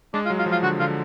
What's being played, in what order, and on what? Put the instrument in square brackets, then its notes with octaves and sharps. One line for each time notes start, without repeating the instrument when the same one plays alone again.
[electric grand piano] G#3 [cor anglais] D4
[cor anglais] F4
[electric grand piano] F#3
[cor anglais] F4
[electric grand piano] F3
[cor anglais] F4
[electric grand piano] D3 [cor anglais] F#4
[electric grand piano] D3 [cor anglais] F4